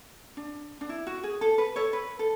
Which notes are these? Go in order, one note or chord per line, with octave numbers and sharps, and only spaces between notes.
D4
D4
E4
F#4
G#4
A4
B4
A4 C#5
B4
A4